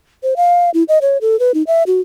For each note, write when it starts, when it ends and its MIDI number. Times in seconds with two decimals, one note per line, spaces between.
0.23 0.34 72
0.37 0.70 77
0.74 0.83 64
0.88 0.99 75
1.01 1.18 73
1.21 1.39 69
1.39 1.52 71
1.54 1.63 63
1.67 1.83 76
1.87 2.01 66